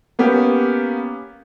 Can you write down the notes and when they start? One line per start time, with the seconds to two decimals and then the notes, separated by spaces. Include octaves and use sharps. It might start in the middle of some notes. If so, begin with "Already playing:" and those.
0.19 A#3 B3 C#4 G4